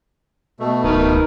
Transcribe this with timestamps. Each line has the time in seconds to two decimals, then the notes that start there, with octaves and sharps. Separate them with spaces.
0.60 B2 A3
0.84 D1 D#3 A#4 B4